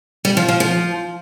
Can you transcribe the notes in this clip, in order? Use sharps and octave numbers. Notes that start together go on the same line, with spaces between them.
G3
F3
F3
F3